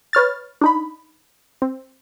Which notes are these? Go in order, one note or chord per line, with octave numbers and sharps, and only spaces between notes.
B4 C#5 F6 A6
D4 D#4 B5
C4